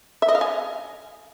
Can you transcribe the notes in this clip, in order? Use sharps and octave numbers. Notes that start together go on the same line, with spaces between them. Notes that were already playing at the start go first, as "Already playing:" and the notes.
E5
D#5
F5
G#5